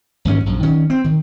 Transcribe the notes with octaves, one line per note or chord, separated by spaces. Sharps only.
D#2 G#2 C4 C#4
A#1 F#2
D#3 C#4
C4
D#3